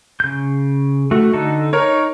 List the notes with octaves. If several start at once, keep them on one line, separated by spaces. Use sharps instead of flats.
C#3 G6
A3 F#4
D3 D#4 A4
D#4 A#4 C#5